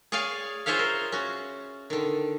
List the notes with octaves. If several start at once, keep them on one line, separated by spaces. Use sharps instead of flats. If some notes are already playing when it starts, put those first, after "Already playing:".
G#4 C#5 D5 F5 G#5
F4 G#4 C5 C#5 E5 F5
A#4
C#4 F#4
D3 D#3